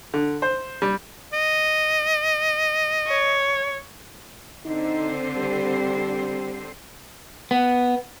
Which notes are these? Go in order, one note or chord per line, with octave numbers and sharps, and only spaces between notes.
D3
C5
G3
D#5
C#5
D3 C4 D#4 C5
G3
B3